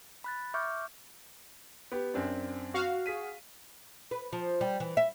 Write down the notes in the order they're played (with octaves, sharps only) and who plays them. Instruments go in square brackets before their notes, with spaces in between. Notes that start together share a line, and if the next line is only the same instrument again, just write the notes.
[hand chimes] B5 F#6 A6
E5 C#6 D6 F6 G6
[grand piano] B3 G4
F#2 C4 D4
[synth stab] F#4 F5
[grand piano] G#4 B6 D#7
[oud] B4
F3
G3
E3
E5